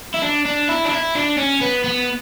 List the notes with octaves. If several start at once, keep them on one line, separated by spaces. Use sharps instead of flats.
E4
D4
D4
E4
D4
E4
D4
C#4
B3
B3